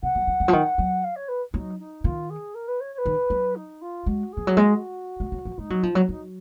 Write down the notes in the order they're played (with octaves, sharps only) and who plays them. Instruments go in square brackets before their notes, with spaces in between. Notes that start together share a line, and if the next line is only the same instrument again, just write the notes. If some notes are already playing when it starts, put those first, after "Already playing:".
[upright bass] B2 [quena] F#5
[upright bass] F#3
F3
D#3
F3
D#3
F#3
[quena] F5
C#5
B4
[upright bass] F#3 [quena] D#4
[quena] D#4
[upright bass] D#3 [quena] F4
[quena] G#4
A#4
B4
C#5
C#5
B4
[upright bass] D#3
F#3
[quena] D#4
F4
[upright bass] G#3 [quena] F#4
[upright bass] F3 [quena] G#4
[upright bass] F#3
[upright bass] G#3 [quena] F#4
[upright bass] G#3
F#3
F3
[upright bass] G#3 [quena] D#4
[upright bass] F#3
F3
F#3
[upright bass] F#3 [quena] D#4